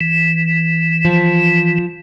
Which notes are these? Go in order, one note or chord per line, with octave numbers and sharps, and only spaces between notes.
E3
F3